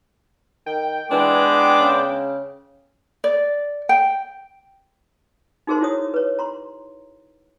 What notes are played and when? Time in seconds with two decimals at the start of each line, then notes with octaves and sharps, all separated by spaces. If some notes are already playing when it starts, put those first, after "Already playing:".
0.66 D#3 G5
1.12 E3 G#3 B3 D4 D6
1.80 C#3
3.24 D5
3.89 G5
5.67 D#4 F#4 G#4 A#4 C5 C6
5.81 E4 F#4 C#5 D#6
6.14 B4 C#5
6.39 A#5 C6